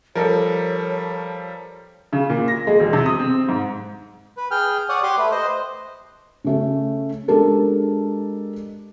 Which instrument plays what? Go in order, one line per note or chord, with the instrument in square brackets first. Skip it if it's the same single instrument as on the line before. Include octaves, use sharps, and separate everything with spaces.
[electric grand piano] F3 G3 [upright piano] A4 A#4 [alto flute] C#5
[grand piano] C#3
A#2
A#6
G#3
E1
C3
D#6
C4
G#2
[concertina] B4
G#4 G5 F6
C#5 D5 F#5 D#6
G4 C6 D6
A3 B4
C5 D#5
[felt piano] C#3 A3 C#4
G#3 D4 G4 A4 A#4